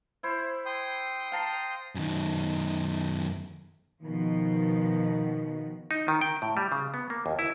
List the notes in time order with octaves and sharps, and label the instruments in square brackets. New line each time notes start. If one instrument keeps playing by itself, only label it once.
[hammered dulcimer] E4 C5
[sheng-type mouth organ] G5 C6 D#6
[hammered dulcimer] F5 A5 A#5
[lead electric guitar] F#2 D#3
[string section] B2 F3 [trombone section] D#3
[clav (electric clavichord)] D#4
D#3
G5
A2
G3
C#3
B3
A#3
D#2
E4